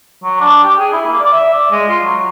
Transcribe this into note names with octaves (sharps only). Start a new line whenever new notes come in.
F#3
D4
G4
G#4
E4
A#3
D5
E5
D5
G#3
F4
F#3